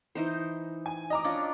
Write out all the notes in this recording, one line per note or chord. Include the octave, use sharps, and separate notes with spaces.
E3 D#4 C5
G#5
D#5 A#5 D6
C#4 D4 F4